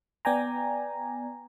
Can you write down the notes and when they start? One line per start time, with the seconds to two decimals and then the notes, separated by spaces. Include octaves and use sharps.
0.25 B3 D5 G5 G#5 A#5